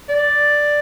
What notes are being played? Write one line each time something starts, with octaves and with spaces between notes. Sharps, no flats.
D5